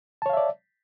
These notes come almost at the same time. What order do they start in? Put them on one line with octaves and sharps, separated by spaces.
A5 C#5 F5 E5 D5